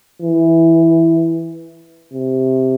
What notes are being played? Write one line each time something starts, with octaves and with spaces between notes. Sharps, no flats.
E3
C3